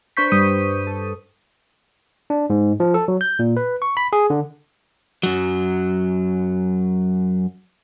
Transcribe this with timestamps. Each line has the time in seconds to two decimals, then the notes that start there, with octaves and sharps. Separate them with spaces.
0.17 D4 B4 C5 C#6 G6 B6
0.32 G2 G3 D#6 D#7
0.87 A4
2.30 D4
2.50 G#2
2.80 F3
2.94 A4
3.08 F#3
3.21 G6
3.39 A#2
3.57 B4
3.82 C#6
3.97 B5
4.13 G#4
4.30 D3
5.23 F#2 F#3